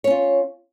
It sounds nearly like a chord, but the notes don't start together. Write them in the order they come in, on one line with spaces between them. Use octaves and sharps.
C#5 C#4 F4